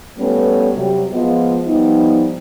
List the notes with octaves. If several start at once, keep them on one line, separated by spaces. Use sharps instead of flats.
G3 A3 B3 C#4 F4 B4
C3 F#3 G3
F3 G#3 B3 F4
F3 G3 B3 D#4